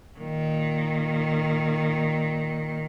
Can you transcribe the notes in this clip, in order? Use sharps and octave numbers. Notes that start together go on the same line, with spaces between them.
A#2 D#3